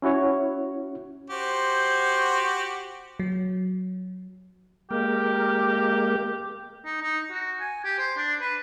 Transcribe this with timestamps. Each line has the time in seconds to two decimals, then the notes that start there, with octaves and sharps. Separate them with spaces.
0.02 C#4 E4 F#4 C#5
1.30 F#4 G4 C5
3.20 F#3
4.91 G#3 A#3 G4 A#4
6.85 D#4
7.01 D#4
7.31 F#4
7.60 G#5
7.85 G4
7.99 C5
8.17 D4
8.41 B4